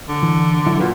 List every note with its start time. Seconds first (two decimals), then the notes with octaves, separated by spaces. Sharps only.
0.08 D3
0.23 E3
0.67 F#3 E4
0.80 A#2 F4 F#4 B4